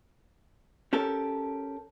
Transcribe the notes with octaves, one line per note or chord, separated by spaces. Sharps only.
C#4 G4 A4 A#4